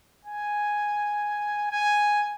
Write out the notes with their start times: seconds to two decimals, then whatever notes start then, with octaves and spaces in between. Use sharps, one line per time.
0.25 G#5
1.71 G#5